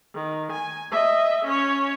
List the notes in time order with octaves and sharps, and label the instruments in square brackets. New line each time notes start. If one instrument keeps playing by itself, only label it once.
[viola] D#3
G#5
D#5 E5
C#4 C#5